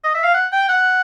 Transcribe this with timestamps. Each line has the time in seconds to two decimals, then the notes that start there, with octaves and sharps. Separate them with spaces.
0.04 D#5
0.14 E5
0.24 F5
0.34 F#5
0.52 G5
0.69 F#5